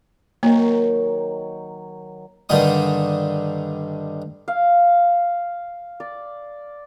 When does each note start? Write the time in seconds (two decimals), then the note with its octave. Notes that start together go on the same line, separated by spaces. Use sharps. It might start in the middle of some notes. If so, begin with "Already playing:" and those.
0.43 D#3 F#3 A#3
2.49 G2 D3 D#3 D#4 D#6
4.48 F5
6.00 D5